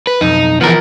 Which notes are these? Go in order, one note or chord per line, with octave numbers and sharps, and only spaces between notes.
B4
B1 F2 D#4
E3 F3 B3 A#4